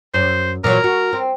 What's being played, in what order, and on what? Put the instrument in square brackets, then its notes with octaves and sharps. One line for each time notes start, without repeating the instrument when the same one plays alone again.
[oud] F#2 [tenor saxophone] C5
[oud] A#2 E3 F#3 [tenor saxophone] A#4
[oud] F#4
C4